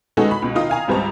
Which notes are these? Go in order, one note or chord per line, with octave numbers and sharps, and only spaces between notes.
G#3 B3 C#4 D#4 F#4 A4
B5
C#2 B2
D#3 D#4 F4 D#6
F5 G#5 A#5
G#1 C#2 G3 C4 A5 A#5